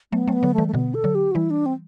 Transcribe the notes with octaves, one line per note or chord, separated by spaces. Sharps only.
F#3 A3 B3
F#3 A3 C4
B3
D3 F#3
E3 G3 A3
A3
B2 D3 B3
A4
D3 F#3
G4
F#4
E3 G3 E4
D4
C4